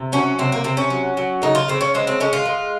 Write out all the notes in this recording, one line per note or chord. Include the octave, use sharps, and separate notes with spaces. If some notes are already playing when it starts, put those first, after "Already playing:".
Already playing: C3
F#3 C#4
C3 C4
A#3
C3 C4
C#4
F#3
F#3
C#3 D#4
F4
C#3 C4
C#4
G#3 C4
C4
G#3 C#4
F4
G#3